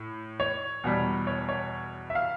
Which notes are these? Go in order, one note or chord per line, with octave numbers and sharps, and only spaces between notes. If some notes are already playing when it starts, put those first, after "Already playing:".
Already playing: A2
C#5
E2 B2 G3
C#5
C#5
E5
F5